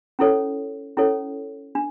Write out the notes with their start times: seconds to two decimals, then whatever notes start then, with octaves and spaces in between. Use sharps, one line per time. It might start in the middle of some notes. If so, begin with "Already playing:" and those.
0.19 C#4 E4 A4 C#5
0.97 C#4 E4 A4 C#5
1.75 D4